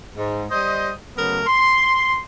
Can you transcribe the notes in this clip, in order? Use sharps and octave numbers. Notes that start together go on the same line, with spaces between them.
G#2
G3 C5 D#5
C#3 F#3 A3 B3 A#4
C6